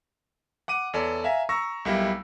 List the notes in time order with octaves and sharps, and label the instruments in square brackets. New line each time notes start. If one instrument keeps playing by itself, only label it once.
[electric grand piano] F#5 D6 D#7
E2 A4 C#5 D5
E5 F5 G#5 A#5
A#5 C#6 E6 A#6
B1 G3 A#3 E4